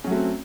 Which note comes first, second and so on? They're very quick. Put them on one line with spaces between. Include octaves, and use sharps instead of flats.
C#4 F#3 A3 F#4 C4